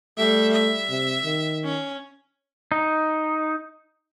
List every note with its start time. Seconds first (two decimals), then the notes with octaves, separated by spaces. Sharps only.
0.18 G3 A3 E5
0.53 E5
0.89 C3
1.24 D#3
1.64 C#4
2.72 D#4